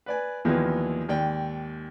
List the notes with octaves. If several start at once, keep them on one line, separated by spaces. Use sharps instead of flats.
B4 D5 G#5
D#2 A#2 E3 F3 G#3 B3
D#2 G#2 D5 G5